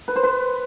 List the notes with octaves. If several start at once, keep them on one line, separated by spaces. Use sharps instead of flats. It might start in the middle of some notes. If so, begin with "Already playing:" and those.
B4
C5
B4